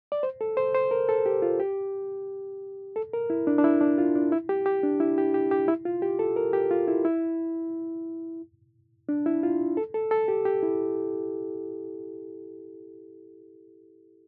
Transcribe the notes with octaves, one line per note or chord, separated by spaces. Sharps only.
D5
C5
A4
C5
C5
A#4
A4
G4
F4
G4
A4
A#4
E4
D4
D4
E4
D4
F4
D4
E4
G4
G4
D4
E4
G4
G4
G4
E4
F4
G4
A4
A#4
G4
F4
E4
E4
D4
E4
F4
A4
A4
A4
G4
G4
E4